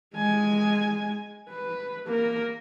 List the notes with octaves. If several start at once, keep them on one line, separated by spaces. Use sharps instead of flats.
G#3 G#5
B4
A#3 A#4